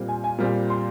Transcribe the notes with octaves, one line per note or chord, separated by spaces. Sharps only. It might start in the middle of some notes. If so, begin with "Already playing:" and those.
Already playing: A#2 G3 C4
G#5
G#5
A#2 G3 C4
C6